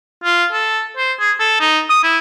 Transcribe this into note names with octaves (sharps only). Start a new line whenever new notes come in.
F4
A4
C5
G#4
A4
D#4
D#6
E4